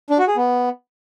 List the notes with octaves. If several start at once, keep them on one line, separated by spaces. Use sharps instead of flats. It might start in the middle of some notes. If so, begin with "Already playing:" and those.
D4
F#4
G#4
B3